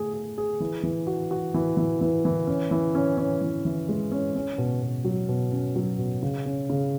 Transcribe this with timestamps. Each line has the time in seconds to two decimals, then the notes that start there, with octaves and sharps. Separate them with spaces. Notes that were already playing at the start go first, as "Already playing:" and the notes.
Already playing: A3 G#4
0.14 G#4
0.38 G#4
0.60 E3
0.83 E3
1.07 F#4
1.31 F#4
1.54 E3
1.77 E3
2.01 E3
2.25 E3
2.47 C#4
2.71 E3
2.95 C#4
3.17 C#4
3.42 E3
3.65 E3
3.89 G#3
4.12 C#4
4.36 C#4
4.58 B2
4.82 B2
5.05 F#3
5.28 B2
5.52 C#4
5.76 F#3
5.98 B2
6.23 C#3
6.46 C#4
6.70 C#3